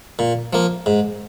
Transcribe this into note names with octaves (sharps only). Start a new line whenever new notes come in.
A#2
F3 A#3
G#2